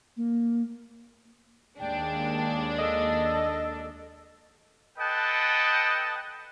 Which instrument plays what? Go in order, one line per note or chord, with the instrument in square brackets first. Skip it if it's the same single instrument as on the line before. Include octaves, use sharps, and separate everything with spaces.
[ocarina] A#3
[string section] D#2 G#3 D4 [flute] G5
[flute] A4 [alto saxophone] D#5
[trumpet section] A4 B4 D#5 F#5 G5 A5